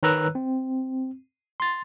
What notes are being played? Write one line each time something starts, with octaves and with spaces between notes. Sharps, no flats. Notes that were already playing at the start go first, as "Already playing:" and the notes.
D#3 B4 C#5 A#5 E6 F#6
C4
C6 A6